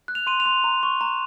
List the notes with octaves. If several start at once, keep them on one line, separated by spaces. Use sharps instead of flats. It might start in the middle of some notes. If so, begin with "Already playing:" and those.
F#6
F7
C6 D#7
F7
C6
A#5
C#6
A#5